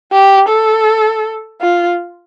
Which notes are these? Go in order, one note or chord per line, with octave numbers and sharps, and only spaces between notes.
G4
A4
F4